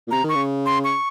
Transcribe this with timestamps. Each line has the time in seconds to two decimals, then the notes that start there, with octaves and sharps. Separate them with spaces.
0.07 A#2
0.11 C3 A#5
0.24 D#3
0.29 C#6
0.35 C#3
0.66 C6
0.84 C#6